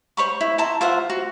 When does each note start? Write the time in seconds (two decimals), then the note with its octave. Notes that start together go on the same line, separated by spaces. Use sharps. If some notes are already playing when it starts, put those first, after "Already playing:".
0.17 C5 C#5 B5 C#6
0.41 E4
0.58 E4 A5 A#5 C6
0.81 F4 C5 E5 F#5
1.10 F#4